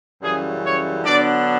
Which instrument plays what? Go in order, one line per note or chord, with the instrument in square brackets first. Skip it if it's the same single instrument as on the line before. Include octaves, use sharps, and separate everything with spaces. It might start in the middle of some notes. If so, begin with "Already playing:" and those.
[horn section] F#2 C#3 E3 G3 G#4
C#5
D3 F#3 B3 D4 D5